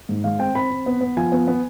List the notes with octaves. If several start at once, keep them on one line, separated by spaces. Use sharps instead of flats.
G#2
G#3 F5
C4 G5
C4 B5
C4
B3
B3
F3 G#5
B3
B3